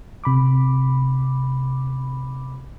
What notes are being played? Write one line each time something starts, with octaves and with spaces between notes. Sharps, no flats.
C3 B5 D6